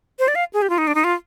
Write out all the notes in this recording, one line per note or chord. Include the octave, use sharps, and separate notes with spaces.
C5
D5
F5
G#4
G4
F4
D#4
D4
D#4
F4